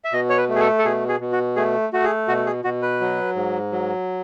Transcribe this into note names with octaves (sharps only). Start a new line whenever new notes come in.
E5
B2 D#5
C#5
B4
A3
G#4
A4
A4
B2 G#4
G#4
B2
F#4
A3 G#4
A3 F#4
G#4
B2 F#4
G#4
B2 F#4
B4
F#3
G#2
F#3